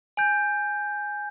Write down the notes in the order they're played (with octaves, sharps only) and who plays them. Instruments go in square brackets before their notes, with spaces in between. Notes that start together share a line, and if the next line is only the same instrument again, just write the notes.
[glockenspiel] G#5 G6